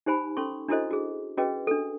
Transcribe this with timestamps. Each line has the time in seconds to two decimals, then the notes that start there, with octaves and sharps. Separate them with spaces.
0.06 D#4 G4 C5 G#5 B5
0.37 C#4 A4 C6 C#6
0.68 D4 E4 F#4 A4 C5 D#5
0.91 F#4 G#4
1.37 C#4 F#4 G#4 B4 D#5 G5
1.67 D4 A4